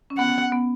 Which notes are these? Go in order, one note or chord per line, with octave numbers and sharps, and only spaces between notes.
C#4
B3 F#5
B3